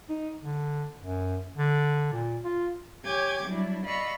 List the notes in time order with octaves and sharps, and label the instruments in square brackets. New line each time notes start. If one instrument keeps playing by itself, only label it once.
[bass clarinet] D#4
D3
F#2
D3
A#2
F4
[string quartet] G4 C#5 G5 G#5 D6 G#6
F#3 G3 D4 E4
D5 D#5 F5 B5 C#6 E6